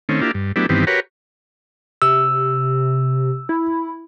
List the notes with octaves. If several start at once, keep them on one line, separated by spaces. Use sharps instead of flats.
D#3 A3 C4 C#4
A#3 D4 E4 F4 G4
G2
F#3 A3 B3 D4 E4 G4
G2 D#3 E3 B3 C4 G4
F#4 G4 A#4 B4 C#5
C3 E6
E4